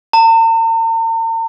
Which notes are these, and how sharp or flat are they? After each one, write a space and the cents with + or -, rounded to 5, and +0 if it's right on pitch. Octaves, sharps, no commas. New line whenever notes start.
A#5 -45